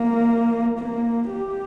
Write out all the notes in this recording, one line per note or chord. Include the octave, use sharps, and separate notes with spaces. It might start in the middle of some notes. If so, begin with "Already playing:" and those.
Already playing: A#3
A#3
G4